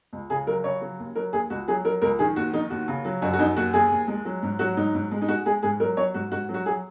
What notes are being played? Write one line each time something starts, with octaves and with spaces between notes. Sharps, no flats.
C#2
C#3 G#4
F#3 A#4
C#3 C#5
F#3
D#2
F#3 A#4
D#2 G#4
C#2 F#4
F#3 G#4
F#3 A#4
C#2 A#4
D#3 G#4
D#2 F#4
D#3 D#4
D#2 F#4
C#3
F#3
F#2 F#4
F#4
F#2 D#4
D#2 F#4
D#2 G#4
D#2
G#3
F#3
G#2
F#3 F#4
G#2 D#4
G#2
G#3
D#4
G#3 F#4
G#3 G#4
G#2 G#4
F#3 A#4
F#3 C#5
G#2 F#4
G#2 F#4
F#3
F#4
F#3 G#4